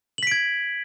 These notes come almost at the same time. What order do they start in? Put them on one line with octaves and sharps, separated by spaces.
F#7 B6 D7 G#6